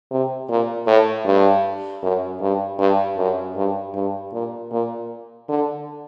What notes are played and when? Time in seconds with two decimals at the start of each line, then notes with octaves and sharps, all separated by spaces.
0.11 C3
0.49 A#2
0.87 A2
1.25 G2
2.02 F#2
2.41 G2
2.79 G2
3.17 F#2
3.56 G2
3.95 G2
4.33 A#2
4.72 A#2
5.48 D3